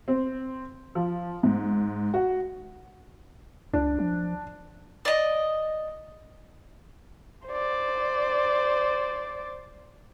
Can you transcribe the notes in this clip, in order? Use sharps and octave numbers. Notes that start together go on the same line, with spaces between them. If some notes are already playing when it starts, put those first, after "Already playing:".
C4
F3
G#2
F#4
C#2 D4
F3
D5 D#5
C5 D5